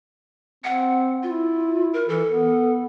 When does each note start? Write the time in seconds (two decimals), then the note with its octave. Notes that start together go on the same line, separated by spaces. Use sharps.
0.64 C4 F#5
1.23 E4 F4
1.93 A#4
2.09 E3 A4
2.29 B3